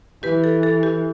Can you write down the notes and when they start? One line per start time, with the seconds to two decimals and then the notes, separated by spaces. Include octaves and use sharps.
0.23 E3 G4 B4
0.44 A4
0.63 A4
0.83 G4